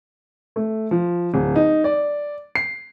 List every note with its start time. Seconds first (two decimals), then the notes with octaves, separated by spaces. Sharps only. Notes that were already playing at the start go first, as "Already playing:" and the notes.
0.56 A3
0.91 F3
1.34 D1
1.56 D#4
1.84 D5
2.55 C7